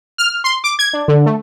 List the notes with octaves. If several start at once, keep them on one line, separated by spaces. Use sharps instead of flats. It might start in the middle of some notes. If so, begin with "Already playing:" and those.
F6
C6
D6
G#6
D4
D3
A3